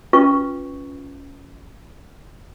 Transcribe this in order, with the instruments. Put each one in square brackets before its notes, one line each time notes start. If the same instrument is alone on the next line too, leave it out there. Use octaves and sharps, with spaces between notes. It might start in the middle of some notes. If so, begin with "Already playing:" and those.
[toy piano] C#4 F4 B4 C#6